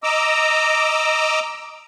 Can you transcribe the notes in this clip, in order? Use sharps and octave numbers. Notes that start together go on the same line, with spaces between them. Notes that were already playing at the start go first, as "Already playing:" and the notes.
D#5 A#5 D6 E6